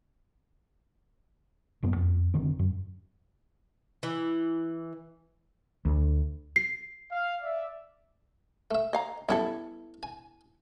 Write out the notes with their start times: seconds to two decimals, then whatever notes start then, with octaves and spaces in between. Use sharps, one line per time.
1.83 D#1 F#2 A#3 B3
1.96 F2
2.34 F1 D3 D#3 C4
2.59 F#2
4.03 E3
5.85 D2
6.56 C7
7.12 F5
7.42 D5 E5
8.71 A3 E5
8.93 D#5 F5 A#5
9.29 F#2 G3 B3 E4 A4 E5
10.03 G#5